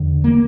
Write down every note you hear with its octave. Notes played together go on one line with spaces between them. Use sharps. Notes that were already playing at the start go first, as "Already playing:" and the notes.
Already playing: E2 D3
A#3